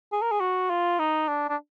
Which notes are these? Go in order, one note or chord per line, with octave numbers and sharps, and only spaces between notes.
G#4
A#4
G#4
F#4
F4
D#4
D4
D4